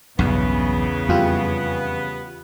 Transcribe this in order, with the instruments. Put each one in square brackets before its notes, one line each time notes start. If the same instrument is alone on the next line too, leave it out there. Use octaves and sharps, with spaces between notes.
[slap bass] B1 G2 [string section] E2 C#3 [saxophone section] B3
[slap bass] F2 [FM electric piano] G3 F4 G4